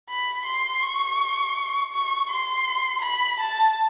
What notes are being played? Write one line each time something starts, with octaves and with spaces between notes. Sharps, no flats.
B5
C6
C#6
C#6
C6
B5
A5